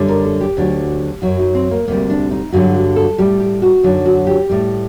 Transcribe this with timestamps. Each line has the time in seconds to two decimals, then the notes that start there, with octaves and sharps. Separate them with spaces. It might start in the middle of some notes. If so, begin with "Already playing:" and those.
Already playing: F#2 D3 G3
0.08 A#4
0.25 A4
0.41 G4
0.57 D2 D3 F#3
1.22 F#2 F#3 F#4
1.39 D#4
1.55 C4
1.71 A#3
1.88 D2 C3 G3 A#3
2.10 D4
2.31 D#4
2.52 G2 D3 F#3 F#4
2.74 F#4
2.96 A4
3.18 A2 G3 G4
3.40 G4
3.62 F#4
3.83 F#2 D3 F#3 D#4
4.06 F#4
4.27 G4
4.50 A2 G3